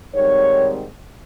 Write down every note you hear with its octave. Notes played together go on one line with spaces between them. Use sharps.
G#2 D#3 G3 C4 D#4 C#5